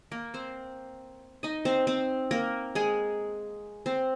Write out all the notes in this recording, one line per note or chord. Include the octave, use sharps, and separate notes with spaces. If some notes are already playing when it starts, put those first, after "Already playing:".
A#3 A#4
C4 C5
D#4 D#5
C4 C5
C4 C5
A#3 A#4
G#3 G#4
C4 C5